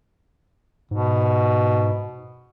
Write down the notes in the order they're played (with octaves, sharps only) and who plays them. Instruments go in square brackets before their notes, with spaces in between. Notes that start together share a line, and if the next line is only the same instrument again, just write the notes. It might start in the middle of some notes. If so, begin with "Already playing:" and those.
[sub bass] G#2 [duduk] B2